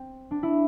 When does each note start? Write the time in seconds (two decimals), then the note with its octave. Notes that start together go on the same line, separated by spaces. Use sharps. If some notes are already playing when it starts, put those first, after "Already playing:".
Already playing: C4
0.31 D4
0.43 E4